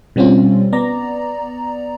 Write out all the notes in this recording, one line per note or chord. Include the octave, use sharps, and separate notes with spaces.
B2 G3 C4 C#4 F4
B3 D5 A#5